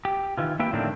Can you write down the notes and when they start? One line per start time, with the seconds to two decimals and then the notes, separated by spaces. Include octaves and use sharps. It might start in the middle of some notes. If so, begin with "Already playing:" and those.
0.05 G4
0.37 D#3 E3 F4
0.59 A#3 E4 G4 B4 E5 G5
0.73 A2 D3 D#3 F3 C4 D4